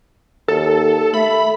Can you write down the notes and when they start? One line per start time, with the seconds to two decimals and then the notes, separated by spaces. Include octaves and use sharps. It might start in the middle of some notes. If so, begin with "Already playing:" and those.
0.48 D#2 A4
1.14 A3 B5